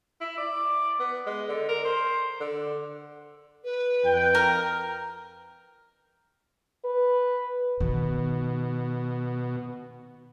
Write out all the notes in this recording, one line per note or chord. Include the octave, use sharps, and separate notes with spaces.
E4
D5
B3
G#3
D3
A#4
C5
D3
B4
F2 G5
A#4
B4
B2 D#3